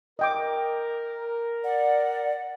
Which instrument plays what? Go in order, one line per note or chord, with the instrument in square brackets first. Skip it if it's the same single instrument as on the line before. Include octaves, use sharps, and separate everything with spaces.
[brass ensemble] A#4 [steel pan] D#5 G5 D6
[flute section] D5 [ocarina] F#5